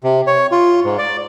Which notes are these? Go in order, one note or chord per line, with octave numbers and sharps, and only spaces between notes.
C3
C#5
F4
G#2
D5